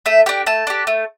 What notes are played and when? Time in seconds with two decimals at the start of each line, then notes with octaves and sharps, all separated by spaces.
0.06 A3 E5
0.26 D4 G4 G5
0.46 A3 A5
0.67 D4 G4
0.87 A3